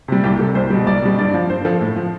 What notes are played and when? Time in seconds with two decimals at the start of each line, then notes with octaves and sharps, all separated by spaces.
0.08 C3 G3
0.24 C2 G4
0.39 C3 G3 A4
0.55 C2 C5
0.70 B2 G3
0.87 C2 D5
1.02 B2 G3
1.18 G2 D5
1.34 F3
1.50 G2 C5
1.65 F3 A4
1.81 A2
1.96 F3